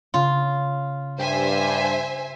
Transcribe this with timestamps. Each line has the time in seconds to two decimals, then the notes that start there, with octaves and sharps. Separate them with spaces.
0.14 C#3 F4
1.19 G2 C5 E5 G5 G#5